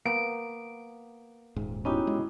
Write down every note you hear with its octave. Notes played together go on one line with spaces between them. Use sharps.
A#3 B3 D7
D#1 G#2
B3 C#4 D#4 E4 F#4 G4
G#3